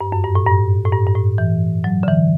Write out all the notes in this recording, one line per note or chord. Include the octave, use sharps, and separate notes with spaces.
G2
F#2
G2
A2
G2
A2
G2
G2
A2
E3
F#3
D3
E3